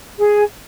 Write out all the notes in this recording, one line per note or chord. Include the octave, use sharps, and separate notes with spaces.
G#4